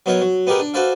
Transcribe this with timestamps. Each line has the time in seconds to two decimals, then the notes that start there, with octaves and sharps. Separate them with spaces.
0.06 F#3 B3 D#4 A#4 C#5
0.21 F#3
0.47 B3 D#4 G4 G#4 A#4 B4
0.59 D4
0.74 F#4 A4 B4 C5 D5 F5